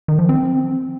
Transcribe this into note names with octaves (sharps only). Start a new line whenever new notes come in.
D#3
F3
C4